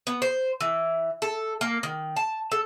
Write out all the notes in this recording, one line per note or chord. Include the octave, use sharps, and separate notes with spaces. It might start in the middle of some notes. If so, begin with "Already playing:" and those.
B3
C5
E3
A4
A#3
D#3
A5
A4